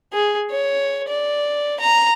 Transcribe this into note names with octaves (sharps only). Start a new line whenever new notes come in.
G#4
C#5
D5
A#5